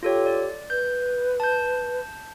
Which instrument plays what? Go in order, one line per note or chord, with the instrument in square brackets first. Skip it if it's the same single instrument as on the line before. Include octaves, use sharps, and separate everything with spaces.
[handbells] F4 A4 C#5 [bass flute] G4
[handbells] D5
[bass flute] B4 [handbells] G6
[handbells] A5 G6